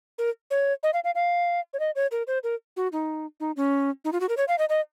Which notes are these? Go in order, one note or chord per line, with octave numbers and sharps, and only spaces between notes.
A#4
C#5
D#5
F5
F5
F5
C#5
D#5
C#5
A#4
C5
A#4
F#4
D#4
D#4
C#4
D#4
F4
F#4
A#4
C#5
F5
D#5
D#5